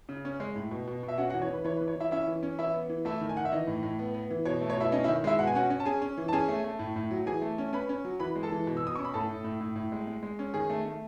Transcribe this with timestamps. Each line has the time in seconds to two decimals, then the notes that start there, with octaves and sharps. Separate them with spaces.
0.09 C#3
0.25 C#4
0.40 G#3
0.55 A2
0.71 B2
0.87 B2
1.03 B2
1.08 E5
1.18 C#4 F#4 F#5
1.30 F#4 F#5
1.34 E3
1.42 C#5
1.50 E3 B4
1.64 E3 C#5
1.77 B4
1.81 E3
1.88 C#5
1.96 E3 E4 E5
2.11 C#4 E4 E5
2.27 E3
2.43 C#4
2.59 E3 E4 E5
2.74 B3
2.89 E3
3.05 A3 E4 E5
3.21 D#3
3.29 G#5
3.36 D#3 F#5
3.45 E5
3.52 E3 D#4 D#5
3.67 A2
3.83 A2
3.99 B3
4.14 B3
4.30 E3
4.45 B2 C#5
4.61 A3
4.70 C#5
4.77 B2 E4 E5
4.92 C#4 D#4 D#5
5.04 E4 E5
5.07 D#3
5.24 G#3 E4 E5
5.39 B2 F#5
5.47 G#5
5.55 C#4 F#4 F#5
5.70 C#4
5.80 A5
5.85 C#4 G#4 G#5
6.02 C#4
6.18 E3
6.28 A5
6.33 C#4 G#4 G#5
6.48 A3
6.64 A3
6.79 A2
6.96 A2
7.11 F#3
7.26 E3 G#4 G#5
7.42 A3
7.58 C#4
7.73 C#4 B4 B5
7.89 C#4
8.05 F#3
8.20 E3 B4 B5
8.36 G#3
8.43 A4 A5
8.52 E3
8.67 B2
8.77 E6
8.83 B2 D#6
8.95 C#4 C#6
9.04 B5
9.14 A2 A4 A5
9.29 A2
9.44 A2
9.61 A2
9.76 A2
9.92 G#3
10.07 G#3
10.23 G#3
10.39 C#4
10.54 D#3 G#4 G#5
10.70 A3
10.85 A3